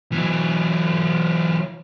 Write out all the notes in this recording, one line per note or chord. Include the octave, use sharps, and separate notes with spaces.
E3 F#3